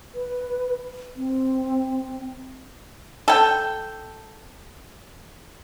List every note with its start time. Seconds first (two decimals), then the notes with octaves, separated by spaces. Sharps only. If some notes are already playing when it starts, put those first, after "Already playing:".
0.15 B4
1.17 C4
3.28 A4 G5